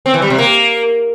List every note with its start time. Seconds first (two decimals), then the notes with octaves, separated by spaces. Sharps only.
0.06 C4
0.14 E3
0.22 G3
0.30 C3
0.38 A#3